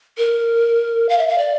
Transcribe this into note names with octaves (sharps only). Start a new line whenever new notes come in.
A#4
F5
E5
F5
D5